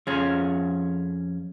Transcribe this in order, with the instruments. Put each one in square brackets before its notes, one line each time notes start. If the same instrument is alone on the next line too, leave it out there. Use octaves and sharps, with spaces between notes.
[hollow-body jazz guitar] F2 F3 C#4 G#4